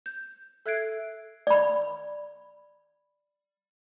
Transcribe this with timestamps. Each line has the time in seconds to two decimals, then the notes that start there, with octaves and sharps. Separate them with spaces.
0.06 G6
0.66 A4 E5 F#6 G#6 C7 D7
1.47 D5 B5